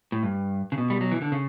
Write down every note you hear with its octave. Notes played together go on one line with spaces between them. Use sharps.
A2
G2
C#3
B2
G3
F#3
E3
D3
C#3